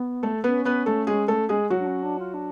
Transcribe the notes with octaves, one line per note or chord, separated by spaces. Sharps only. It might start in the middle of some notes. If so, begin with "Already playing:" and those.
Already playing: B3
A3 A4
B3 C#4 B4
B3 B4
A3 A4
G#3 G#4
A3 A4
G#3 G#4
F#3 F#4
D4
C#4
D4
F4
D4